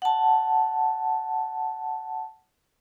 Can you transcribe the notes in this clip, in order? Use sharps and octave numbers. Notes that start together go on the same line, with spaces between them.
F#5 A5